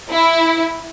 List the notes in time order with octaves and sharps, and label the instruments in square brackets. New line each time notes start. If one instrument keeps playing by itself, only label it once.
[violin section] E4